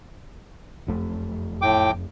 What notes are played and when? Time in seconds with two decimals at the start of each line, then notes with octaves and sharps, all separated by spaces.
0.87 F#1 F2 A3
1.62 A2 G5 D6